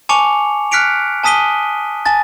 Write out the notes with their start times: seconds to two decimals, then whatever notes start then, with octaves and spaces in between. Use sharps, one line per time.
0.09 G#5 A5 C#6 D6 C#7 F7
0.71 F6 F#6 B6 C#7 D7 F7
1.23 G#5 A5 D#6 B6 D#7 G7
2.06 G#5 A5 A6